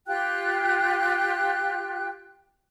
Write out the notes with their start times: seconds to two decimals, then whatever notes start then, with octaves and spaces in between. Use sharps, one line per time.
0.07 F4 G4 G5 F#6